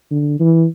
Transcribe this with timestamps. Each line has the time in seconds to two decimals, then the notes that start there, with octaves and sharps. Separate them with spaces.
0.11 D3
0.40 E3